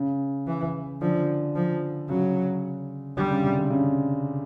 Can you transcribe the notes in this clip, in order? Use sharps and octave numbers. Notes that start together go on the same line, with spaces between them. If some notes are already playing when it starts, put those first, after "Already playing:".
Already playing: C#3
E3
D3 F3
F3
C#3 F#3
D3 G3
C#3
C3
D3
C#3